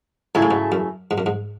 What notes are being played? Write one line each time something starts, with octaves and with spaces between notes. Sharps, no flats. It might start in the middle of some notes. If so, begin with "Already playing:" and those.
G#2 C#3 F#3 A3 E4 G#4
A2
G#2
F#2
G#2
F#2
G#2